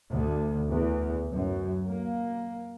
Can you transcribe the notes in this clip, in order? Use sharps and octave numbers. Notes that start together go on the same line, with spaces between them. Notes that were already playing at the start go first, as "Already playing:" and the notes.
D2
E2
F#2
A#3